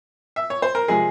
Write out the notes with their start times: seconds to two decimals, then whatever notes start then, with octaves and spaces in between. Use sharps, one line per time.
0.36 E5
0.50 C#5
0.62 C5
0.75 A#4
0.88 C3 F3 G#3 G#4